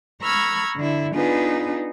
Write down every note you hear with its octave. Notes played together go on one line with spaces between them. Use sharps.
A#5 B5 C#6 E6 F6 G#6
D3 E4
B3 D4 D#4 F4 G#4 B4